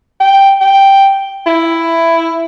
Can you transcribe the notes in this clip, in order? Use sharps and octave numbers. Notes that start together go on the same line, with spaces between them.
G5
G5
E4